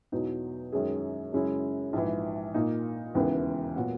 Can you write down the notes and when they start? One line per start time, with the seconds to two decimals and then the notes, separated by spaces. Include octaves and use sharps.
0.12 E2 B2 F#3 B3 D#4
0.72 F#2 D#3 G#3 C#4 G#4
1.33 F#2 C#3 G#3 C#4 E4
1.93 A#1 G#2 E3
2.54 A#2 A#3 D#4
3.15 E1 D#2 C#3 E3 B3
3.76 A#2 F#3 B3 F#4